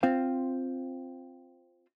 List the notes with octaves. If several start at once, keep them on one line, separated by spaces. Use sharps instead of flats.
C4 F4 C5 F5